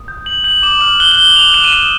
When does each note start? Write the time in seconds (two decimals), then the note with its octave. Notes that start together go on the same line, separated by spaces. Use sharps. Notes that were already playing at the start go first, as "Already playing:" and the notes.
Already playing: D#6
0.08 G6
0.26 G6 F#7
0.44 G6 F#7
0.63 D6 E7
0.81 F6 F#7
1.00 F#6 G7
1.12 G7
1.18 F#6
1.24 F#7
1.36 F#6 F7
1.54 F#6 E7
1.65 D#7
1.72 D#6 E7